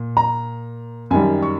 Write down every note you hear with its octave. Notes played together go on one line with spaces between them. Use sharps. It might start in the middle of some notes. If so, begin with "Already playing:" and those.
Already playing: A#2
A#5
F#2 D#3 G3 G#5
C#6